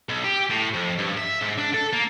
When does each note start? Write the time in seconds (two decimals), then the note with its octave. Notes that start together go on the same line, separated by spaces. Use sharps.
0.09 B1
0.24 G4
0.51 A2
0.74 F2
0.99 G2
1.18 E5
1.42 G#2
1.59 D4
1.74 A4
1.93 A#3